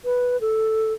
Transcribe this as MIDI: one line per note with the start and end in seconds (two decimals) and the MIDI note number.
0.05 0.39 71
0.41 0.93 69